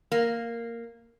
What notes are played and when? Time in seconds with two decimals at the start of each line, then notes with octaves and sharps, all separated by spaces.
0.12 A#3